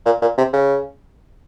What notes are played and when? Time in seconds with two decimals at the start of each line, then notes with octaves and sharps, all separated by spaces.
0.05 A#2
0.22 A#2
0.37 C3
0.53 C#3